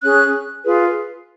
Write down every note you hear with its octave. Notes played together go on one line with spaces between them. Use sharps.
C#4 G#4 C#5 F#6
F4 G#4 B4